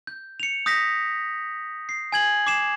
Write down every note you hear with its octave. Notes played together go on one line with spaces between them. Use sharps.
G6
C#7 F7
D#6 G6 A#6 B6
C7
G#5 G#6 F#7
D6 C7 E7